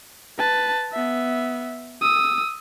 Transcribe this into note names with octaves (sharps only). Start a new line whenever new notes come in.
B4 A5
B3 E5
D#6 E6